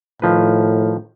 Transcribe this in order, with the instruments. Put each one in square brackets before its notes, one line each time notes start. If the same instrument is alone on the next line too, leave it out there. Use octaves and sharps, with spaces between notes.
[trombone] A2 [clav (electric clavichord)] D#3 F3 B4